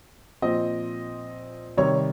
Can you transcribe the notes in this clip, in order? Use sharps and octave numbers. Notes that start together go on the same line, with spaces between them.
A#2 F3 C4 D#5
C3 D#3 G3 C#5